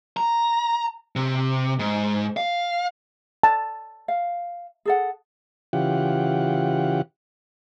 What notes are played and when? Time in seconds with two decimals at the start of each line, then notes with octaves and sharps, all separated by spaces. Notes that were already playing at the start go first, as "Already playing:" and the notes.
0.17 A#5
1.16 C3
1.79 G#2
2.37 F5
3.43 A5
4.08 F5
4.85 G#4 A4 F#5
5.73 C#3 E3 F4 G4 F#5